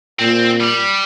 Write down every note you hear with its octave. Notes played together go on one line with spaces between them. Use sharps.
A#2 C4
G3